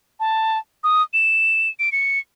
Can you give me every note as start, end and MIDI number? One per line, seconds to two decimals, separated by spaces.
0.20 0.58 81
0.84 1.02 87
1.13 1.69 100
1.79 1.92 98
1.92 2.19 97